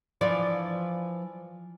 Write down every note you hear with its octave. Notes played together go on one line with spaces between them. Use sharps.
E3 F3 D5